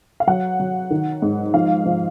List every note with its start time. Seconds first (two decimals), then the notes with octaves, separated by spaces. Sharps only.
0.20 F5
0.27 F#3 F#5
0.60 F#3
0.90 D#3
1.22 G#2
1.54 F3 F5
1.85 F3